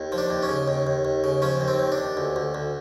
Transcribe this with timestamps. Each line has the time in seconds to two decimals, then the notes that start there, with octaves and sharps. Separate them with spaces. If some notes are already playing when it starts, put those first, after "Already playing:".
Already playing: D#2
0.12 F3
0.18 D4
0.30 D#2
0.43 C#4
0.49 C#3
0.68 D#2
0.87 D#2
1.05 D#2
1.24 C#3
1.42 F3 C#4
1.61 D#2
1.68 C4
1.79 D#2
1.92 D4
1.98 D#2
2.17 D2
2.36 D2
2.55 D2